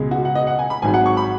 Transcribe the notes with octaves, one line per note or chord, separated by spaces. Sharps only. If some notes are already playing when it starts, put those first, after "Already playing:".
Already playing: C#2 B2 G#3
F#4
F#5
D#5
F#5
G#5
B5
G#1 G#2 F#3 G#5
F#5
C#6
B5